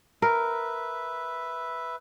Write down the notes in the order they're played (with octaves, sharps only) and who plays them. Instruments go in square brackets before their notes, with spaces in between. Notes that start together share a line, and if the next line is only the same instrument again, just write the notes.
[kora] A#4 [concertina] B4 E5